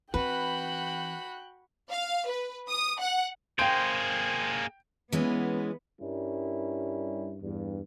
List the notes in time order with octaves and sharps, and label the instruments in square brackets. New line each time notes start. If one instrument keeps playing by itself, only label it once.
[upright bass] E3 C4 [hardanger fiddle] F#4 B5 [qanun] B4 [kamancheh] G5 F#6
[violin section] F5
B4
D#6
F#5
[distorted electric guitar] A#3 G#4 [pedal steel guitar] C5 [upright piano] G5 D7
[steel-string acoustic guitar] E3 G#3 C#4 [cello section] B3
[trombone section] G2 G3 C#4 E4 A#4
E2 G2